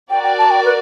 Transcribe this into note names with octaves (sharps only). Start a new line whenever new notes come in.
F#4 A#4 D5 G5
G5
A5
G5
B4